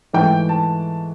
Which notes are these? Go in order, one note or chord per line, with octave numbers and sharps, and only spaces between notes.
G#2 E3 A3 G5
A5